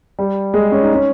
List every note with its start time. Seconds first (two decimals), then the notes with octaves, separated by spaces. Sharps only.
0.19 G3
0.54 G#3
0.72 C#4
0.83 D#4
0.94 C#4